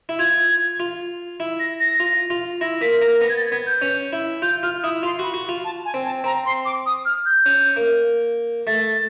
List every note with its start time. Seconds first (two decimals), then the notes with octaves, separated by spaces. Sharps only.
0.09 E4
0.19 F4 G#6
0.80 F4
1.40 E4
1.60 A#6
1.80 A#6
2.00 F4
2.30 F4
2.61 E4 A#6
2.81 A#3 B6
3.01 A#3 A#6
3.21 B3 A#6
3.29 G#6
3.37 A6
3.51 B3 G#6
3.67 G6
3.82 C#4
4.13 E4
4.42 F4 G6
4.63 F4 F6
4.83 E4 D#6
5.03 F4 C6
5.19 F#4 B5
5.34 F#4
5.49 F4
5.64 A5
5.85 G#5
5.94 C4
6.05 A5
6.24 C4 A#5
6.45 C6
6.65 D6
6.86 D#6
7.05 F6
7.26 G6
7.46 C#4
7.76 A#3
8.67 A3 A6